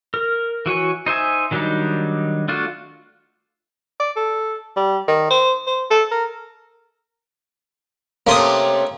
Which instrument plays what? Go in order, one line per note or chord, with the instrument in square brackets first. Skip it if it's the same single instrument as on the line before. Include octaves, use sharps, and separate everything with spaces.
[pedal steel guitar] A#4
E3 F#4 C#5 G#5
D#4 C5 E5 G#5
D#3 F#3 G3 D4 D#4
A3 D4 F4 F#4
[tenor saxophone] D5
A4
G3
D#3
C5
C5
A4
A#4
[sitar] C3 A3 C#4 [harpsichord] A#3 C6 D#6